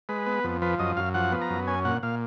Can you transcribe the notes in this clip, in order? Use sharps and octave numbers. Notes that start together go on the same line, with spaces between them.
G#3 B4
B3
F2
F3 B4
F#2 D#5
F#2 F5
F3 F#5
B3
A#5
F#2
C#4 G#5
A#2 F#5
A#2 F5